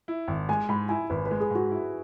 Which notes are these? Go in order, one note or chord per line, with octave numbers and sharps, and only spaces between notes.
E4
G#1
G#3 G#5
G#2 B5
E4 G#5
G#1 B4
B4
G#3
G#4
G#2 F#4
E4